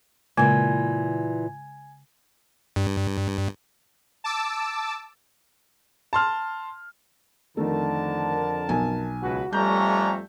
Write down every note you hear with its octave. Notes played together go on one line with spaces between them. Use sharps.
A#2 C#3 E3 G#3 G#5 G#6
G2
A5 D6 E6
A5 C6 F6
F2 D3 D#3 A3 A#4 A5
B1 G#5
C#2 F#4 B4
F2 G3 A3 C#4 D4 A#5 G6